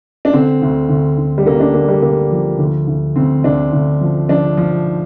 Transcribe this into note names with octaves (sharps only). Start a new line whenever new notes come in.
D4
D3 C4
D2
D2
D2
G3
D3 A#3
D4
D3 A#3
G3
D3 A#3
F3
D2
D2
D2 C4
D2 D4
D2
F3
F3 D4
F3